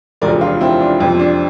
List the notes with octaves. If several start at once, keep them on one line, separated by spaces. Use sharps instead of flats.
E1 D2 C3 F3 A#4 D5
D4 F4
C4 E4
D4
F2 C3 F3 C4
C4
D4